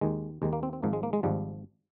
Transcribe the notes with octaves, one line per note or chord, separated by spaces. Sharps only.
D#2 D#3 G#3
D#2 D#3 G#3
A#3
C4
C4
G#1 G#2 F3 A#3
G#3
A#3
G#3
G#1 G#2 F3 G3